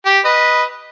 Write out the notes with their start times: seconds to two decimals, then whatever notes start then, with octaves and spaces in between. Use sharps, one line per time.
0.05 G4
0.25 B4 D#5